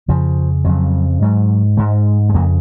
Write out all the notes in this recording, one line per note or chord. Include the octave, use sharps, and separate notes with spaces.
F2 C#3 F3
F2 C#3 F#3
G#2 F#3
G#2 G#3
G#3
F2 C#3 A#3